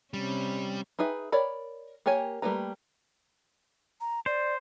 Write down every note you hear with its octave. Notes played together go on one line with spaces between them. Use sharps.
C3 G3 C#4
D#4 G#4 B4 E5
A#4 C#5 D5 B5
A#3 G4 A#4 C#5 G#5
G3 A3 A#3 B4 A#5
A#5
C5 D5